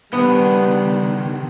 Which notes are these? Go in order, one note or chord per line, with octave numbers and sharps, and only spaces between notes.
D#3 G3 B3 D4